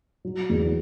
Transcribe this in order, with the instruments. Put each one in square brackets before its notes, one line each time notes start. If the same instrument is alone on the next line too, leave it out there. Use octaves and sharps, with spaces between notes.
[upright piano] F#3
E2